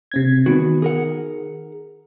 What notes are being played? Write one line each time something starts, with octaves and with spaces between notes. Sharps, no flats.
C3 C4 G#6
E2 D#3 B3 F#4
G#4 A#4 F#5